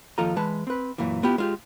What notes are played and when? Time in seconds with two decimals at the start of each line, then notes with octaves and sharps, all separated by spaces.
0.18 D#2 F3 F4 A4 D#5 A#5
0.36 E3 G#3 B4 A5
0.67 C4 B4
0.98 F#2 A#2 E3
1.23 B3 E4 F4 G4
1.38 G#3 F4 G4